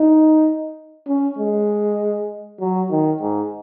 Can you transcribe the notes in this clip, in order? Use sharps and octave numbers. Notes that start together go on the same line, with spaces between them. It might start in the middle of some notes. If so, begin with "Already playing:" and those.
Already playing: D#4
C#4
G#3
F#3
D#3
G#2